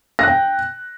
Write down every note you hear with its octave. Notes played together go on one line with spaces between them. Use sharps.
G5 F#6 A#6